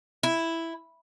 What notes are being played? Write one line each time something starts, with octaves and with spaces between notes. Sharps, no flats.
E4